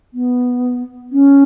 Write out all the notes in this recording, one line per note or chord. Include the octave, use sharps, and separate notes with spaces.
B3
C#4